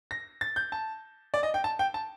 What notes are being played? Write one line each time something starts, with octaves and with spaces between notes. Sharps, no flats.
A#6
A6
G6
A5
D5
D#5
G5
A5
G5
A5